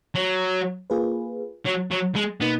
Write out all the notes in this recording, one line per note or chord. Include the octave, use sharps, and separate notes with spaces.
F#3
A#3 F4 G#4 B4
F#3
F#3
G#3
B2 A#3 B3 D#4